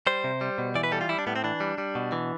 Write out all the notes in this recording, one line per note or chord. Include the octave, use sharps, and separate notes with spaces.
G3 C5
C3
G3
B2
E3 D5
B4
G3 A4
F4
G3 E4
D4
A2 B3
C4
E3 D4
G3
G3
B2
E3